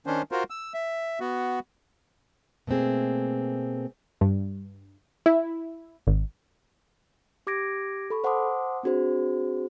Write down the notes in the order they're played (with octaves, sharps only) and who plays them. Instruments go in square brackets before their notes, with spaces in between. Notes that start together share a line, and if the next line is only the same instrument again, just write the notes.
[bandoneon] D#3 C#4 D4 C5
F4 F#4 A#4 C5
E6
E5
B3 F#4
[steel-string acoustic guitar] B2 A3 A#3 C4 G#4
[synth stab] G2
E4
G#1
[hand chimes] G4 D6 G#6 A#6 D7
A4 B5 C#6
C5 F#5 A5 C6 D6 D#6
C4 D4 F#4 G#4 C5